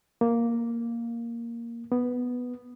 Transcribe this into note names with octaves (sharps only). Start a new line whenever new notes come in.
A#3
B3